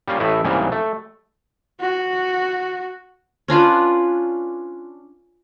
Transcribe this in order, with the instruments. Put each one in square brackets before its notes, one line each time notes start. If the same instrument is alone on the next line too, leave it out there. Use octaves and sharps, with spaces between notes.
[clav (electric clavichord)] G3 A#3 C#4 F4
A1 A2 A3 E4 D#5
C2 G#2 C#3 E3 G3 A#3
A3
[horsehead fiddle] F#4
[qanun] C#4 D4 F4 B4